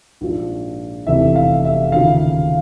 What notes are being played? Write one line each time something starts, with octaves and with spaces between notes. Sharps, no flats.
A#1 G#2 F3
F1 E2 C3 E3 E5
F5
E5
D#2 C#3 F3 F5